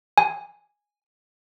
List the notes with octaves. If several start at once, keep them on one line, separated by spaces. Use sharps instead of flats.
G#5